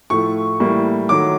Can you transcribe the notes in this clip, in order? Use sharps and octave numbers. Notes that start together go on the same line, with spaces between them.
A2 F3 A3 C#6
A2 E3 G3 A#3
D#3 F#3 A3 D6